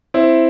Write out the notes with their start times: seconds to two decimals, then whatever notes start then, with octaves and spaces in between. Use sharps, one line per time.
0.14 C4 E4